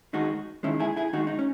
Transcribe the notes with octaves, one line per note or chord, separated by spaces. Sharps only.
D#3 G#3 D#4 F#4
D#3 G#3 C#4 E4
E4 G#4
E4 G#4
D#3 G#3 D#4 F#4
D#4
C#4